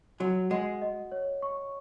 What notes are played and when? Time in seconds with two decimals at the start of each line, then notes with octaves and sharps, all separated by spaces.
0.20 F#3 F#4
0.51 G#3 F#5
0.82 D#5
1.12 C#5
1.42 C#6